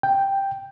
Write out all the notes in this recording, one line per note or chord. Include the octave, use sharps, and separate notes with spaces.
G5